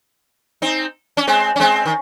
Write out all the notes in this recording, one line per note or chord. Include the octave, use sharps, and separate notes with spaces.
C4 D#4
C#4
G#3 C4
C#4
G#3 C4
D#3